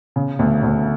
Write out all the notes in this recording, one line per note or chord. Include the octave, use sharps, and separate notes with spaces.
C#3
D2
D2